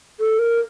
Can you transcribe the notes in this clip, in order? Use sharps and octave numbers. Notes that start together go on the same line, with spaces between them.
A4
A#4